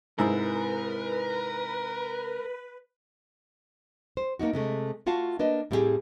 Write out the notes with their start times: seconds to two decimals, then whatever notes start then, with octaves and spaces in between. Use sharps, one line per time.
0.19 G#2 C3 E4 A#4 B4 B5
4.17 C5
4.39 A#3 D4 D#4 F#4
4.53 C3 G#3 A3
5.06 A3 F4 F#4 F5 A5
5.39 A#3 D4 B4 D#5
5.71 A2 G3 C4 D#4 G4 G#4